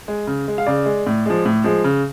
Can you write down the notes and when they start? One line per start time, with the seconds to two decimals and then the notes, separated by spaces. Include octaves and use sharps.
0.08 G#3
0.27 C#3
0.48 G#3
0.58 F5
0.67 C#3 D5
0.86 G#3
1.07 A2
1.26 F3 G#3
1.45 A2
1.64 F3 G#3
1.84 C#3